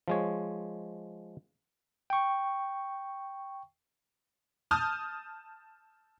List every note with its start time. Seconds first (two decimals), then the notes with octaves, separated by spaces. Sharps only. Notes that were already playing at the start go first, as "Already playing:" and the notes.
0.08 F3 G#3 C#5
2.10 G5 C#6
4.71 A5 D#6 F6 G6